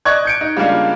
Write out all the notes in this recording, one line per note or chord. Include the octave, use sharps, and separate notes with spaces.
D5 D#5 C#6 F#6 G#6
G6 C#7 D7
D#4
C#3 G3 G#3 A#3 D4 F4